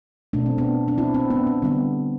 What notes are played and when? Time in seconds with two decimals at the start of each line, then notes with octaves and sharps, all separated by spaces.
0.33 B2 A3 D4
0.46 C4
0.58 B3 D4
0.88 D4
0.98 C4 E4
1.14 C4 E4
1.30 B3 D4
1.47 C4
1.62 D3 G3 B3